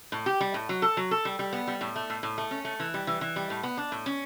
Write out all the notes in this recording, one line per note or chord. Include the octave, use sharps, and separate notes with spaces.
A2
G4
G3
A2
F#3
A4
F#3
A4
G3
G3
B3
G3
A2
A3
A2
A2
A3
C#4
A3
E3
G3
E3
E3
G3
A2
B3
D4
A2
C#4